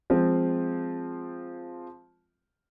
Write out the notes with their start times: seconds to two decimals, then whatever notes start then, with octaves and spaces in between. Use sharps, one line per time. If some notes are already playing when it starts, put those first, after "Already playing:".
0.10 F3 G#3 C4 F4